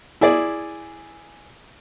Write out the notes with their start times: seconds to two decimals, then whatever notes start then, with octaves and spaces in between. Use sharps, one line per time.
0.21 E4 G#4 D5